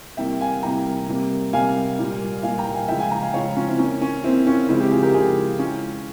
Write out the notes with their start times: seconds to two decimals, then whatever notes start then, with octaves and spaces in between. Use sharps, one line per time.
0.17 C3 E3 G3 A#3 E5 G5
0.41 F5 G#5
0.63 C3 E3 G3 A#3 G5 A#5
1.08 C3 G3 A#3
1.53 C3 G3 A#3 F5 G#5
1.98 A#2 G3 A#3
2.43 A#2 G3 A#3 F5 G#5
2.58 G5 A#5
2.73 F5 G#5
2.88 C#3 F3 G#3 E5 G5
2.99 F5 G#5
3.11 G5 A#5
3.22 F5 G#5
3.34 C#3 F3 G#3 C#5 F5
3.56 C#4 F4
3.67 C4 E4
3.79 E3 A#3 C#4
4.02 C#4
4.24 E3 A#3 C4 E4
4.47 C#4 F4
4.69 C#3 F3 G#3 C4 E4
4.80 E4 G4
4.92 F4 G#4
5.03 G4 A#4
5.14 C#3 F3 G#3 F4 G#4
5.59 E3 G#3 C#4 F4